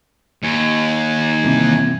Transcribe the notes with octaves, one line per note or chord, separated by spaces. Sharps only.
D#2 G#5
G2 C3 E3